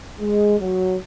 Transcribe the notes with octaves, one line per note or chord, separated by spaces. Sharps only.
G#3
F#3